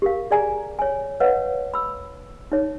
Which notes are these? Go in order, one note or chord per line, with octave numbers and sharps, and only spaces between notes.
G4 A#4 F5
G#4 D5 G#5 A#5
C#5 G#5
B4 C#5 D#5 F5 F#5
B5 E6
D#4 C#5